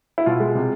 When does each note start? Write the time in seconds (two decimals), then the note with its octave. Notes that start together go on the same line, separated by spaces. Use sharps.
0.18 E4
0.26 B2 F4
0.40 G#3
0.55 C3